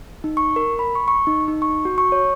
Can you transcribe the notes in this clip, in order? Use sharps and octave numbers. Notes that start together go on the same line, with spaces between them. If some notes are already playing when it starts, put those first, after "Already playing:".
D#4
C#6
A#4
B5
C#6
C#6
D#4
D#4
C#6
F#4
C#6
C#5